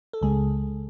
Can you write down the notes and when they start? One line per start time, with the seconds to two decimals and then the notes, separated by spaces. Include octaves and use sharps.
0.13 A4
0.21 C#2 C#3 G#3 G#4